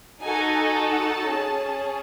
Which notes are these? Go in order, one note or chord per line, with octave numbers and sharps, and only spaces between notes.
D#4 F#4 A4 G#5
A5
C#4 G#4